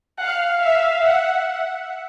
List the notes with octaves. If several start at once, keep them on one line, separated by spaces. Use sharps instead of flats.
F5 F#5
E5 F5
F#5